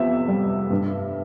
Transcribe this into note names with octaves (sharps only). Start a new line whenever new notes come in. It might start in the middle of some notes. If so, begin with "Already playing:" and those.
Already playing: F2 C3 B3 E5
G3
G2